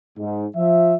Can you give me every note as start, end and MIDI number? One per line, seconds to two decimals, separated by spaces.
0.18 0.46 44
0.56 0.95 53
0.56 0.95 76